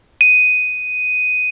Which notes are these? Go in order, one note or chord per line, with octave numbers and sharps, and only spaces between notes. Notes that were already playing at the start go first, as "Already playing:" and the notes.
D#7